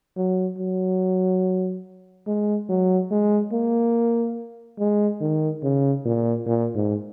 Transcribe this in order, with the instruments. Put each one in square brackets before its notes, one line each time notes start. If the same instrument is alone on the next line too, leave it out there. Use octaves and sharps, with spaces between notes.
[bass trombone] F#3
F#3
G#3
F#3
G#3
A#3
G#3
D#3
C#3
A#2
A#2
G#2